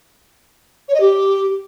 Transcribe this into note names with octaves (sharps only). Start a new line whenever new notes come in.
C#5
D#5
G4